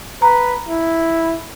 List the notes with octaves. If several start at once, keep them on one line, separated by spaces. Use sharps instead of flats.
B4 A#5
E4